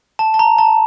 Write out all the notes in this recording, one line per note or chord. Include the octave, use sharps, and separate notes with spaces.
A5
A5
A#5
A5